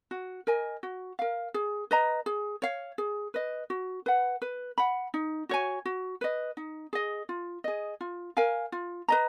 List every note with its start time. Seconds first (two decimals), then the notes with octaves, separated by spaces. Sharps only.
0.11 F#4
0.47 A#4 D#5 G#5
0.83 F#4
1.19 A#4 F5
1.54 G#4
1.91 B4 D#5 A#5
2.26 G#4
2.62 C#5 F5
2.98 G#4
3.34 B4 D#5
3.70 F#4
4.06 B4 F#5
4.42 B4
4.78 F#5 B5
5.14 D#4
5.49 F#4 C#5 G#5
5.85 F#4
6.21 B4 D#5
6.57 D#4
6.93 G#4 D#5
7.29 F4
7.64 G#4 D#5
8.01 F4
8.37 A#4 F5 G#5
8.72 F4
9.08 B4 D#5 A#5